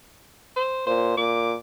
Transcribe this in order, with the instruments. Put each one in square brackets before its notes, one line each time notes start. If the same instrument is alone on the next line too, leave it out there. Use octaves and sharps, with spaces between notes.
[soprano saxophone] C5
[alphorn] A#2 [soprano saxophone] C5
[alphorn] A#2 [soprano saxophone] D6